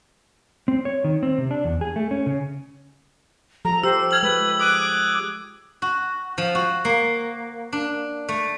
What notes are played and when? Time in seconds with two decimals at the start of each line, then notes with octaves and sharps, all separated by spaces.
0.68 C4
0.85 C#5
1.04 D#3
1.23 C4
1.38 C3
1.51 D4
1.64 E2
1.81 G#4
1.96 A3
2.11 C#4
2.26 C#3
3.65 F3 A4 A#5
3.84 G4 C5 E6
4.11 F6 G#6 F#7
4.23 G#3 B4
4.59 D6 D#6 F#6 D#7
5.82 F#4
6.38 F3
6.55 F#4
6.85 A#3
7.73 D4
8.29 A3